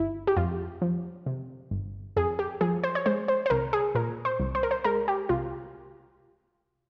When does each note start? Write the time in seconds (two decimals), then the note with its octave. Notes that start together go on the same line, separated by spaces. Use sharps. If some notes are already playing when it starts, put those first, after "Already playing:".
Already playing: G1 E4
0.27 G4
0.37 F2 F4
0.82 F3
1.26 C3
1.71 G1
2.16 F2 G#4
2.39 G4
2.61 F3 G#4
2.84 C5
2.95 C#5
3.06 G#3 C5
3.28 C5
3.46 C5
3.50 C2 A#4
3.73 G#4
3.95 A#2 A#4
4.25 C5
4.40 C2
4.55 C5
4.63 A#4
4.71 C5
4.84 G#3 A#4
5.08 G4
5.29 C2 F4